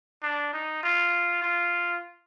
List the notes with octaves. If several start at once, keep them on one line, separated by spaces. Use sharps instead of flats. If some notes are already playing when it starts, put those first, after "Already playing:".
D4
D#4
F4
F4